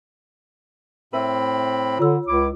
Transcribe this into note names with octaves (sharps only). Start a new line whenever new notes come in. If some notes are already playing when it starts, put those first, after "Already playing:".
A2 C4 A#4 E5 B5
D3 F4 C#5 E6
C#2 E4 D6